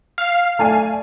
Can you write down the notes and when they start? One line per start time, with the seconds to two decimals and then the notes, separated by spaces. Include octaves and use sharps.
0.18 F5
0.59 A3 D5 G#5